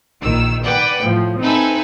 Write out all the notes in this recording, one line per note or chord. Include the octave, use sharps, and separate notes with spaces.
A#1 D#3 E6
B4 D5 F#5 G5
A2 F3
C4 D#4 A4 B4 E5 G#5